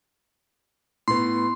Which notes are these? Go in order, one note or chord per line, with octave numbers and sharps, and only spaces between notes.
A2 B3 C6